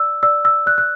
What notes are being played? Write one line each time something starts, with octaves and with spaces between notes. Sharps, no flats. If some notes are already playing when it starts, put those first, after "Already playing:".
Already playing: D5 E6
D5 E6
E6
D5 F#6
F#6